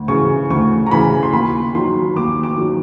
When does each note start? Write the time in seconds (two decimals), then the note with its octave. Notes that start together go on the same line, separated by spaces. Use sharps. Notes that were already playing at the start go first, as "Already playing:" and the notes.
Already playing: D2
0.08 C#3 E3 C#6
0.50 D2 C#6
0.86 A#5
0.91 C#3 E3 B5
1.23 C6
1.33 D#2 B5
1.75 D#3 F#3 C6
2.16 D#2 D6
2.43 D6
2.58 D#3 F#3